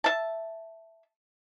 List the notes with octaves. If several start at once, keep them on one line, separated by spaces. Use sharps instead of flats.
E5 A5